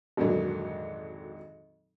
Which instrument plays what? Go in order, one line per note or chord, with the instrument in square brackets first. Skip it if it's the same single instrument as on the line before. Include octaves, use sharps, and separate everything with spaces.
[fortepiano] G#1 F2 A#2 D3 F#3